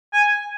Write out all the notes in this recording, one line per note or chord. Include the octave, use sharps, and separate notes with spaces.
G#5